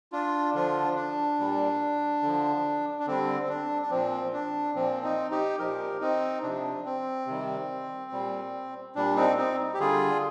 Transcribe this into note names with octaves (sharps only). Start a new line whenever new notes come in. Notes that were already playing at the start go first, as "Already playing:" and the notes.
D4 F4
D3 F3 D4 F4
D4
A#2 G3
D3 F3
D4
D3 G3 C4
C4
D4
D4
A#2 F3 C4
D4
A#2 F3 C4
C4 D#4
D#4 G4
A#2 F3 G4 A#4
C4 D#4
C3 F3 D4
C4
C3 D#3 G3
A#2 G3
A#2 G3 D4
C4 D#4
C4 D#4
G4
D3 G3 F4 G#4